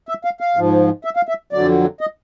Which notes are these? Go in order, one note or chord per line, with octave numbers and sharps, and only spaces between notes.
E5
F5
F5
G#2 F3
E5
F5
E5
F2 D3 F#3 D5
D#5